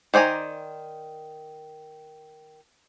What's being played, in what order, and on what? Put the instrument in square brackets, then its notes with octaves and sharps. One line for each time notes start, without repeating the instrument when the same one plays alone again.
[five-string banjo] D#3 C5 D5 G#5 A#5